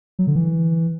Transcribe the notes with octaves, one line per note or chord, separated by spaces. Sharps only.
F#3
D3
E3